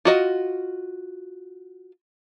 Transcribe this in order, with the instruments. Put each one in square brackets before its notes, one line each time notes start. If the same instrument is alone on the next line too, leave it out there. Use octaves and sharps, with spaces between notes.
[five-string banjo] F4 F#4 D#5